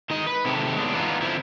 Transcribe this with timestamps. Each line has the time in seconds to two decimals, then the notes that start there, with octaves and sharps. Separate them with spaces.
0.10 D#3 G#3 D#4 D#5
0.26 B4
0.45 C3 D#3 G#3 A3 G4 A4
0.75 F#3 G#3 B3 D4
0.94 E2 E3 B3 D4 D#4 F4
1.21 D3 F3 C4 E4